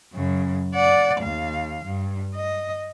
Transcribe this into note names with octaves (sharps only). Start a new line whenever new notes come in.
F#2 C#3
D5 F#5
D#2 F5
G2
D#5